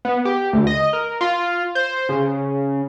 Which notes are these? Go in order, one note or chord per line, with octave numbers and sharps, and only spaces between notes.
B3
G4
D2
D#5
A#4
F4
C5
C#3